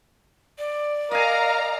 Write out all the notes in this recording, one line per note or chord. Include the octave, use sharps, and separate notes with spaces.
D5
A#4 D#5 F5 G#5 A#5